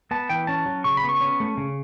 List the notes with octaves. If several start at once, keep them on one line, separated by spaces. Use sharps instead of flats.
B3 A5
E3 G5
C#4 A5
F#3
C#3 C#6
B5
B3
C#6
C#4
A3
C#3